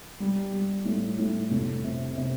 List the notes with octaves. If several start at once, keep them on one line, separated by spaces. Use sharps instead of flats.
G3
G3
A2
A2
F1
C3
C3